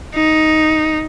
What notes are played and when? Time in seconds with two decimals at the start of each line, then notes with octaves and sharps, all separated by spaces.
0.15 D#4